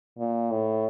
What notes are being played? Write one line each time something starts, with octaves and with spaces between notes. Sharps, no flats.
A#2
A2